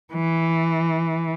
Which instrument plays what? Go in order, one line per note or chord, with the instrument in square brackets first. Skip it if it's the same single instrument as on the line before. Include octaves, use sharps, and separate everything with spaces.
[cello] E3